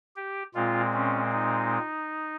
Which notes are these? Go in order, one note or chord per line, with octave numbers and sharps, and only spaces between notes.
G4
A#2 G#3 C4 F4
C#4
D#4